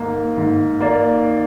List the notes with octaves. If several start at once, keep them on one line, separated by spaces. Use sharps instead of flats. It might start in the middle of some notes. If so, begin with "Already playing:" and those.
Already playing: G#2 A#3
G#2
A#3 D5